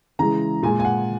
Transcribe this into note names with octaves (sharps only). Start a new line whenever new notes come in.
C#3 E3 G#3 A#5
A#2 G#3 G#5
G#5
F#5